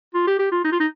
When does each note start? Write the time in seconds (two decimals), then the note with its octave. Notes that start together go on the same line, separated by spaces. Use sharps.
0.14 F4
0.27 G4
0.39 G4
0.52 F4
0.65 D#4
0.72 F4
0.80 D#4